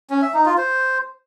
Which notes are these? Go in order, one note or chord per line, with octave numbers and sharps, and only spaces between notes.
C#4
E5
D#4
F4
C5